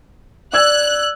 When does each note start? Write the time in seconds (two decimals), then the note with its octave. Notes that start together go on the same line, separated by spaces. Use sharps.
0.53 D5 E6 F#6 G#6